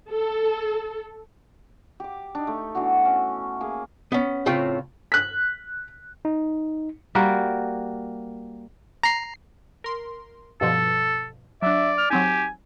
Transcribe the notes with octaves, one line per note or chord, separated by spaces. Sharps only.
A4
G4 D6
D4 D#4
A3
E3 B3 D4 F#4
C#4
A#3 G#4
B3 C#4
A2 C#3 C4 F4 C#5 G5
F#6 B6
D#4
G3 A#3 F#4 A#4
A#5 C7
A#4 C6
G2 B2 F3 A4
F#3 D4 D5 E5
F6
F#3 C4 D#4 G4 G#5